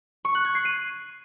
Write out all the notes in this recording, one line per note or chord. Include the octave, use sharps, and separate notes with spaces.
C#6
F#6
G#6
C7
D#7